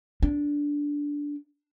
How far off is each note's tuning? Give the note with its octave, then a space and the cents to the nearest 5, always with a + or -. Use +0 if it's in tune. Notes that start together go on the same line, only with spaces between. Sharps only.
D4 -10